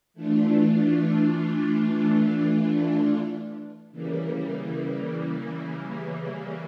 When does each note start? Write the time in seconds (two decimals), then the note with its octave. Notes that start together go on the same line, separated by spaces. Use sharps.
0.14 E3 A3 D4 F4
3.91 C#3 E3 G3 A#3